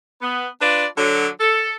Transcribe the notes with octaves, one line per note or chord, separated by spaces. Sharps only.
B3
D4 F4 B4 D5
D3 F#3
A4